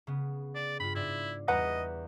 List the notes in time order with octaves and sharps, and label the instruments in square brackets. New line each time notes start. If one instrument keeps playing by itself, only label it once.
[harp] C#3 B3
[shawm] D5
[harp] G2 F4 [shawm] B5
[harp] G#2 D5 [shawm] E4
[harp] E2 G3 B6 [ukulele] B4 F#5 A#5 [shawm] D#5